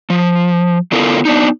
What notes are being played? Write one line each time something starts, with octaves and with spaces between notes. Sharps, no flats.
F3
D3 B3 E4 F4 A4 A#4
B3 D4 D#4